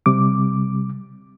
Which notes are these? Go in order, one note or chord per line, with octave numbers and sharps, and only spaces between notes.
C3 G3 D6